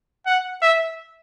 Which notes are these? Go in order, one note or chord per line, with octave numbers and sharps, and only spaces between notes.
F#5
E5